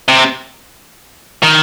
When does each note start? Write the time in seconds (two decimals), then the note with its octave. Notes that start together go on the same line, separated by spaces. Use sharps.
0.08 C3
1.43 D#3